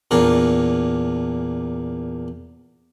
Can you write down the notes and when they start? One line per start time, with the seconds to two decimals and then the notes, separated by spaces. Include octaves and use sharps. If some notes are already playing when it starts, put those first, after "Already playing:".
0.11 E2 A#2 D4 A#4